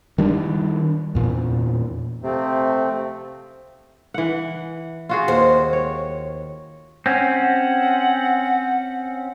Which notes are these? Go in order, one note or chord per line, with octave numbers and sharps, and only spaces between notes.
D#3 G3 D4
E2 A#2
C3 F3 A3 C4
E3 F#5
F4 F#4 G#4
D#2 C5
C#5
C4 C#4 F#5